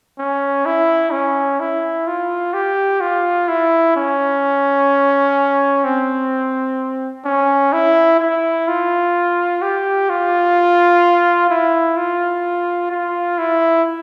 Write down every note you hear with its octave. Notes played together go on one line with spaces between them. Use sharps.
C#4
E4
C#4
E4
F4
G4
F4
E4
C#4
C4
C#4
E4
E4
F4
G4
F4
E4
F4
F4
E4